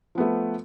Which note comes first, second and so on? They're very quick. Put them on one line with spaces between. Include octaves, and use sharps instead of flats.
F3 B3 A3